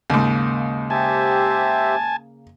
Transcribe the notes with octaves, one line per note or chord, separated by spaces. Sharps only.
D#2 G#2 C#3 A#3
G4 C5 E5 G#5 A5